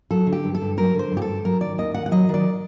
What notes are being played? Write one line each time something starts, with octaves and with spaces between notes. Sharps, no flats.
F#3 A4
D3
G4
G2
A4
G2
F#3 A#4
D3 C5
G2
G4
A4
G2
F#3 A#4
D#3 D5
D#2 D#5
D#2 F#5
F#5
F#3 D#5
D#3
D5